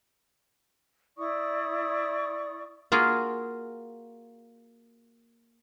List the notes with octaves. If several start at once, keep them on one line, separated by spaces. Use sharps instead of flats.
E4 D5 C#6 D#6
A#3 F4 F#4 G#4